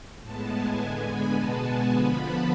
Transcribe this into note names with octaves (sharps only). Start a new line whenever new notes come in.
A2 G#3 B3 A5
G#5
D3 G#3 B3 G#5
B5
B2 G#3 B3 A5
G#5
D3 F3 B3 B5
A5